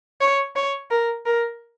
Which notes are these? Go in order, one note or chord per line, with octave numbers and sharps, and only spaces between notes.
C#5
C#5
A#4
A#4